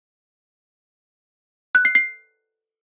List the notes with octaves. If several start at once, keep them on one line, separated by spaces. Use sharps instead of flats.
F#6
C7
C7